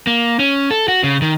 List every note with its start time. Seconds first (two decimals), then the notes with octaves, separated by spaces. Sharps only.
0.07 A#3
0.39 C#4
0.70 A4
0.88 F#4
1.04 C#3
1.22 D#3